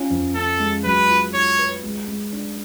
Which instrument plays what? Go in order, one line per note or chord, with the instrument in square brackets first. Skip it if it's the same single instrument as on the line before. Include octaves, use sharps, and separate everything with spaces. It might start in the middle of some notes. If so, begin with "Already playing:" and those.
Already playing: [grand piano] C#4 F4
F2
[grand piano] C#4 [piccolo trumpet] A4
[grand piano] G#3
[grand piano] F#3 [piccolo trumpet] B4
[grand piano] F4
[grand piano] F4 [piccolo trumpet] C#5
[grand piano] B4
G#3
G#3
D4